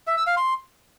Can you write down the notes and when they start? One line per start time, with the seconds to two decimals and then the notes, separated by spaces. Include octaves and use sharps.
0.07 E5
0.17 E6
0.27 F5
0.37 C6